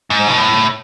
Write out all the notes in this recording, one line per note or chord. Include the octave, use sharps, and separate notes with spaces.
G#2
B2
A2